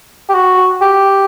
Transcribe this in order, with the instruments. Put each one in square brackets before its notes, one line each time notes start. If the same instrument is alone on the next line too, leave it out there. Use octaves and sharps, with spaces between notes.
[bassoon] G4
F#4
G4